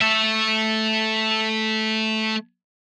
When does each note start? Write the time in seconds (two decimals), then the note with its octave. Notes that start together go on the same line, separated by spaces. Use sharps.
0.01 A3 E5